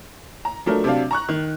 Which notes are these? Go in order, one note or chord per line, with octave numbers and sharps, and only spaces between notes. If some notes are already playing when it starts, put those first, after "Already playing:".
A#5
F3 F#3 A3 D4 A#4
C3 F#3 D4 F5
A#5 C#6 F#6
D#3